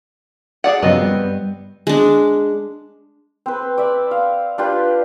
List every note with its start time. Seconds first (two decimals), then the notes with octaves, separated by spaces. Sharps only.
0.64 G#4 D5 F#5
0.83 F#2 C#3 F3 B3 C4 D#5
0.98 G2 G3
1.87 G#3 D4
3.46 C4 B4
3.78 D5 E5
4.11 F5
4.58 D4 F4 G4 B4